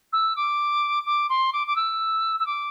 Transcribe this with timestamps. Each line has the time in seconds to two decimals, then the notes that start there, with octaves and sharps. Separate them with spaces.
0.12 E6
0.36 D6
1.05 D6
1.29 C6
1.52 D6
1.67 D6
1.76 E6
2.39 E6
2.46 D6